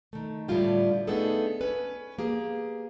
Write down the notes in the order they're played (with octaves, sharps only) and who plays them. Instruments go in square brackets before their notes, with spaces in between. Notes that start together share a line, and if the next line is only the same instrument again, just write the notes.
[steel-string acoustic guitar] D#3 A3
A2 D3 G3 E4 F4 G4
A3 B3 D4 D#4 G#4 A4
C#4 B4
A#3 G4 G#4